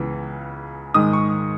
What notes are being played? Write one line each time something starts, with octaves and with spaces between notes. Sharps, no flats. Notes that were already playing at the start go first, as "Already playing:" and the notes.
Already playing: C#2 C#3 E3 B3
G#2 D#3 G#3 D#6
C#6